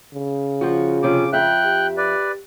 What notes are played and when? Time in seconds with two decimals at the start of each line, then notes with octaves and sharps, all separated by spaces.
0.14 C#3
0.61 F3 F#4
1.03 C3 F3 C#4 D6
1.33 F2 E5 G5 F#6
1.65 G4
1.97 B4 D5